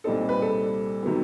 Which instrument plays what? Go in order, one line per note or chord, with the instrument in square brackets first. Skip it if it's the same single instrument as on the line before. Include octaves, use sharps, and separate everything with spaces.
[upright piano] C2 A#2 G3 C4 D#4 A4
B4
A4
C3 D#3 F#3 B3